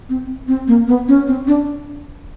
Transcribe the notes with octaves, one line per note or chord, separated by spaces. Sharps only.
C4
C4
A#3
B3
C#4
C4
D4